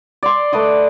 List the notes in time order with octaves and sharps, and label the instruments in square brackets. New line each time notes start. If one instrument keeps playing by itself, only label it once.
[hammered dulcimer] D5 C6
A3 B4 D5 D#5